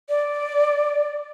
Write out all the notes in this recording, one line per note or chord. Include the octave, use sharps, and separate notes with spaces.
D5